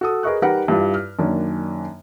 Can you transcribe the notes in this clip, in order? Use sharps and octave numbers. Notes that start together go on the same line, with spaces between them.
F#4 A4 D#6
G#4 A#4 B4 D#5 C#6 F#6
G3 D#4 A#4 B4 F#5
G2 G3 E4 F4
F6
F#2 D#3 A#3 C#4 D4